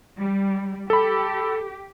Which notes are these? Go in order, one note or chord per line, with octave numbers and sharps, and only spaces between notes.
G3
G4 A4 B5